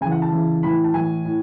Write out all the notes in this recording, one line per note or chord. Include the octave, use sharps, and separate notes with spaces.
C#3 E3 G#5
F#5
A5
C#3 E3
A2 E3 B5
A5
A2 E3 G#5
A2